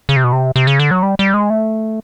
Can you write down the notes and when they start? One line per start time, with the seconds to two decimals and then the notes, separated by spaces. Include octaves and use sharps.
0.09 C#3
0.16 C3
0.24 B2
0.33 C3
0.56 C3
0.67 C#3
0.80 D3
0.91 F#3
1.03 G3
1.19 G3
1.34 G#3
1.50 A3